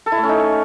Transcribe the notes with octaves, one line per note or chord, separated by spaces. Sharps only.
A4
E4
A3
C#4
D#4